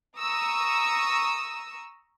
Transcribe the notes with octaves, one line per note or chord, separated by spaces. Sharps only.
A#5 C#6 D#6 E6